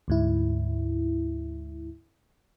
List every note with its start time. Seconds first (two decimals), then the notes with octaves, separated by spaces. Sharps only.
0.08 D2 G#2 E4